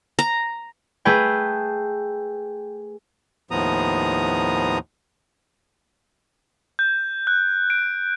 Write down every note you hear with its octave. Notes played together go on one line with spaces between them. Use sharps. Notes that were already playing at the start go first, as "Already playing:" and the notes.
A#5
A3 G#4 B4 G5
D#2 A2 F3 B3 A#5 D#6
G6
F#6
D7